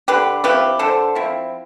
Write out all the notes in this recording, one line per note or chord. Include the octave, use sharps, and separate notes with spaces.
D3 G4 B4
F3 C4 E4 G4 B4
D3 A4 C5
F3 C4 E4